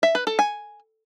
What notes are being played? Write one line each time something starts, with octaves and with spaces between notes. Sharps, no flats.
E5
B4
A4
G#5